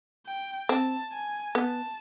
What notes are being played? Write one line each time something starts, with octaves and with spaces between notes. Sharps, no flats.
G5
C4 A5
G#5
B3 A5